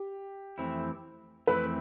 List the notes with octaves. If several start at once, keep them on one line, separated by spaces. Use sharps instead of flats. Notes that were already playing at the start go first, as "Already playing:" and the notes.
Already playing: G4
F2 E3 A3 C4 E4
F2 E3 A3 C4 E4 B4